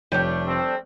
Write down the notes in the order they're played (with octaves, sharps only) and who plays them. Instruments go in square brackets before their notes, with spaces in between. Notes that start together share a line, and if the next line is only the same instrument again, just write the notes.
[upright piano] F1 C#5 G5 [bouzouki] G3 A3 D4
[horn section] C4